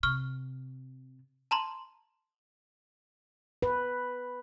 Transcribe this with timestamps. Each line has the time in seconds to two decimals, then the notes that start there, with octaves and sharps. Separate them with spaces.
0.03 C3 C#6 F6
1.51 A5 A#5 C6
3.62 B4